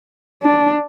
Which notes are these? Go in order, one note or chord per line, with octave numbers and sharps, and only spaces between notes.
D4